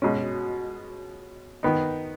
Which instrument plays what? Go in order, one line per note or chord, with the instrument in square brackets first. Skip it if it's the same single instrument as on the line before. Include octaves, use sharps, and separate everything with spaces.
[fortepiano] B2 G#3 C#4
D#3 B3 D#4